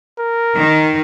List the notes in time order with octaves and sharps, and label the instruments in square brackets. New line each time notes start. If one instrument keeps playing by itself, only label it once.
[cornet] A#4
[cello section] D#3